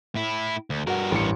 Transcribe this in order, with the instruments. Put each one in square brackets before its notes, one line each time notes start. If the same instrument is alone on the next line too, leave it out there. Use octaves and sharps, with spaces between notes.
[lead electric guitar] A2 E4
D2
[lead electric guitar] G2 A#4 [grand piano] F#4
[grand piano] A1 C#7